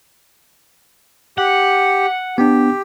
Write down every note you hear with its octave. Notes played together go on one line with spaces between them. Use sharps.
G4 F#5
B3 D4 G4